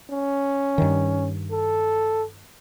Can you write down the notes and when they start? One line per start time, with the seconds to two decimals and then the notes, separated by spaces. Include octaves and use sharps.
0.11 C#4
0.78 G2 D#3
1.51 A4